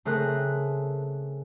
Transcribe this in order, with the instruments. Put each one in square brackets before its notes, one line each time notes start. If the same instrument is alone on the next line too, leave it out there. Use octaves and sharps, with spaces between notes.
[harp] C#3 A3 C4 A#4 D#6 F#6